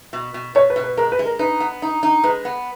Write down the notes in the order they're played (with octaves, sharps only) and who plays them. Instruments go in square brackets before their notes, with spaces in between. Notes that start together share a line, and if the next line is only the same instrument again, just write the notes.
[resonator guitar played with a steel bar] B2
B2
[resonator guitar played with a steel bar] B2 [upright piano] C#5
[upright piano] B4
[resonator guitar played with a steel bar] B2
[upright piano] B4
[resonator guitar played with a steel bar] G#3 [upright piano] A#4
[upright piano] B4
[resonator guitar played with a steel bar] G#3
[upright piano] A#4
[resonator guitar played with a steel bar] D#4 [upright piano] B4
[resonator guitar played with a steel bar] B3
D#4
D#4
[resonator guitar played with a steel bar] G#3 [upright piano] B4
[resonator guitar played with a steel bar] B3